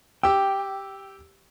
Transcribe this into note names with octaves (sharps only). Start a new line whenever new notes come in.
G4 G5 E6